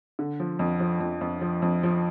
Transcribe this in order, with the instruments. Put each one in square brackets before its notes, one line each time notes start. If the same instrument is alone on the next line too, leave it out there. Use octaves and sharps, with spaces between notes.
[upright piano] D3
F3
F2
F3
F2
F2
F3
F2
F3